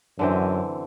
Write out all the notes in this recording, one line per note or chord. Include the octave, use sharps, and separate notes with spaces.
F#2 D3 E3 C4